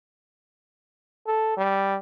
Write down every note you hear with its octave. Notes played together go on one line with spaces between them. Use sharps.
A4
G3